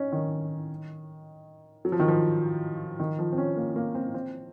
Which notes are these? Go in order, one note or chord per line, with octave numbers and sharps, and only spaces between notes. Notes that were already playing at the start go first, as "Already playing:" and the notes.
Already playing: C#4 D#4
D#3
F#3
F3
D#3
F3
D#3
F3
C4
C#4
A#3
A#3
C4
C4